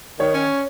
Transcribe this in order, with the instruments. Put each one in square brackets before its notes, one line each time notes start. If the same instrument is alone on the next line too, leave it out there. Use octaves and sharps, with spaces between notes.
[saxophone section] D#3 [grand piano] C#5
[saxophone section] C#4